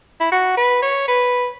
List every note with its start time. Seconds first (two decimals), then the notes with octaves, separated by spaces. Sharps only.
0.20 E4
0.32 F#4
0.57 B4
0.82 C#5
1.08 B4